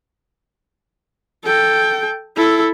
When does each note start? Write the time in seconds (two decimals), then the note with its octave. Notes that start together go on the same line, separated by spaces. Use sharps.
1.44 A4 G5
2.37 E4 A4